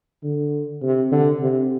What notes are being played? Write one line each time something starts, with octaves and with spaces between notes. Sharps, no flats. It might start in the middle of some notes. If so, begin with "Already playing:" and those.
D3
C3
D3
C3